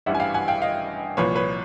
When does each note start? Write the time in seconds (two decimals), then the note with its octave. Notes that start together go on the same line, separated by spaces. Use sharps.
0.06 A1 G2 E3 G3 E5 F#5
0.15 G#5
0.20 F5 G5
0.34 F#5 G#5
0.48 F5 G5
0.62 D#5 F5
1.17 C2 A#2 F3 B4 C#5
1.36 B4 C#5